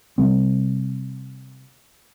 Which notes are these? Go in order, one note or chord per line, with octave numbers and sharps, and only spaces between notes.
C3 G3 C4